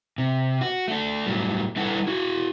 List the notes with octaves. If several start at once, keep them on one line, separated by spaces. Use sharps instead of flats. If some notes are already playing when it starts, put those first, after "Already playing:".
C3
F#4
A3 D4
A2 F#3 G3
G3 D4 E4 A4 B4 F#5
E4 F#4